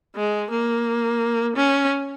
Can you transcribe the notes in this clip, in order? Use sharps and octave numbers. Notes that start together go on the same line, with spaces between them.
G#3
A#3
C#4